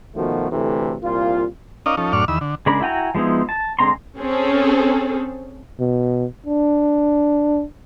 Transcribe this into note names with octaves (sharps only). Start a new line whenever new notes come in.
B2 D#3 F3 A3 F#4
D2 A2 C3 E3 A3
C2 A#2 F4
C#4 D#4 A#4 D5 D#5 F5
F3 C#4 D#4 A4
F#2 A2 D4 D5 C#6 F6
E2 D#3 B5 E6
D3
C#3 G#3 D4 A#4 B5
E4 F#4 G5 G#5 A#5
F3 G#3 B3 D#4 E4
A5
D3 G#3 C4 A#5 C6
C4 C#4 G#4 A4
B2
D4